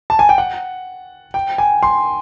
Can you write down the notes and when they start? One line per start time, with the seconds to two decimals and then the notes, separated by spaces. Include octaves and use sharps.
0.10 A5
0.19 G#5
0.29 G5
0.38 F#5
1.34 G5
1.58 G#5
1.83 C6